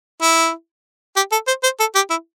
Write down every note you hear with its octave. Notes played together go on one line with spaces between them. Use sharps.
E4
G4
A4
C5
C5
A4
G4
E4